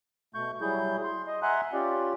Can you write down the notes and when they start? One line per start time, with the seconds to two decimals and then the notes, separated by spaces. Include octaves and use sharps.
0.35 B2 A3 C#6 G6
0.61 F#3 G3 E4 G#4 G6
1.03 C6
1.27 D#5
1.42 E5 F#5 G#5 A#5 C6 F#6
1.73 C#4 F4 G4 D5